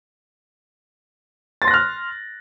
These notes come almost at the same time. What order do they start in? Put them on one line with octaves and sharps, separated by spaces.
A6 C6 A#6 F#6 F6